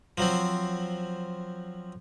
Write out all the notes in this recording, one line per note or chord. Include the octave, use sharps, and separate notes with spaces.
F3 F#3 C4